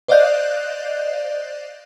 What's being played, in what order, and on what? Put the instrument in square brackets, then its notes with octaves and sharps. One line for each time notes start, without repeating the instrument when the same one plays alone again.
[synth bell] C5 D5 D#5 F5 F#6 G6